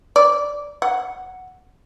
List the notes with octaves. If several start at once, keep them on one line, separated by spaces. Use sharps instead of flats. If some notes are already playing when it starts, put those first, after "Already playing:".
D5
F#5